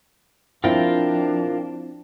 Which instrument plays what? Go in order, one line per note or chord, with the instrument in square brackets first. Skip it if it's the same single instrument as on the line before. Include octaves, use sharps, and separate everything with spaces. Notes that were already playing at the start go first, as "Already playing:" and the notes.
[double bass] F3 D4 [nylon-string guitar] C4 E4 [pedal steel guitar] F4 A#4 G5